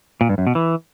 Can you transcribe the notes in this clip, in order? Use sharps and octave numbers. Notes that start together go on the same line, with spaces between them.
A#2
G2
F#2
B2
E3